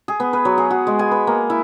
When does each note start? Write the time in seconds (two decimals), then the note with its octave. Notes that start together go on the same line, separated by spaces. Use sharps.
0.08 G#4
0.20 B3
0.33 B4
0.45 F#3
0.58 G#4
0.71 F#4
0.87 G#3
0.99 G#5
1.11 B4
1.27 A#3
1.50 E4